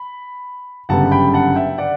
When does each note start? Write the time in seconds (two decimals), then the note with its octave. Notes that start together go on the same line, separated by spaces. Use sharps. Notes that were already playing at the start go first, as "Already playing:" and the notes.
Already playing: B5
0.89 G1 F#2 C#3 G3 B3 F#5 A5
1.12 G5 B5
1.34 F#5 A5
1.55 E5 G5
1.78 D5 F#5